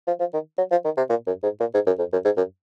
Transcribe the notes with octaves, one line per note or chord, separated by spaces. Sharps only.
F3
F3
D#3
F#3
F3
D#3
C3
A#2
F#2
G#2
A#2
G#2
F#2
F2
F#2
G#2
F#2